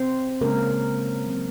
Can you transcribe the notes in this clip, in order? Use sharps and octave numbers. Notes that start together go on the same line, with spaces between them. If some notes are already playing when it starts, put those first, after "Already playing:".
Already playing: C4 C5
C#3 G#3 A#3 C#4 A#4
C#3 F#3 C4